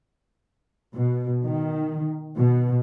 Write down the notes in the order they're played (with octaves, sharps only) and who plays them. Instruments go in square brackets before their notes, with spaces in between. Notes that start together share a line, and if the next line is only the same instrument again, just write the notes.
[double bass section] B2
D#3
B2